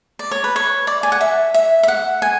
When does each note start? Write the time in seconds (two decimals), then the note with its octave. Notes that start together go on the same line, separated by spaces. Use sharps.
0.19 D5
0.31 C#5
0.44 B4
0.56 C#5
0.87 D5
1.03 G#5
1.12 F#5
1.21 E5
1.54 E5
1.83 E5
1.88 F#5
2.22 G#5